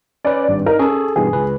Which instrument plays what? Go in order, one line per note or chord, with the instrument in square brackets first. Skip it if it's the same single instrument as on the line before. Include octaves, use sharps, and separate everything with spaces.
[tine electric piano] C#4 B4 [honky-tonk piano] D5
[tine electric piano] G#1 G2
[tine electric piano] D#4 [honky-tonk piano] A#4
[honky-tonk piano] C#4 [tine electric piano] G#4 A4
[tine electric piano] G2 B2 E3 [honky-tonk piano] G#4
[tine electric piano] C#2 B4